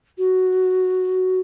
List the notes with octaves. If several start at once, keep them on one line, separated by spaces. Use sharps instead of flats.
F#4